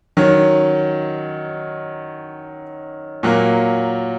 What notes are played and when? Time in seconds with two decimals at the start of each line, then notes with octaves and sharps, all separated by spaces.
0.17 D#3 F#3 C#4
3.23 A#2 F#3 A#3